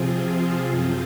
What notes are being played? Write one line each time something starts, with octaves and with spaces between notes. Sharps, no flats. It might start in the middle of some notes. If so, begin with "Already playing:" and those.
Already playing: C3 F3 C4 F4 G#4
F#2 F3 C4 F4